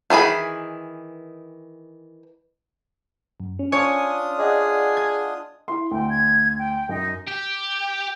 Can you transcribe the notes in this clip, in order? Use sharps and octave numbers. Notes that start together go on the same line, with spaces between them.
D#3 E3 G#4 B5
F#2
C#4
D4 F4 C#5 G#5 D#6
G#4 D5 D#5 F#5
G#6
E4 C6
D2 G5
G#6
G5
F#2 D#4
G4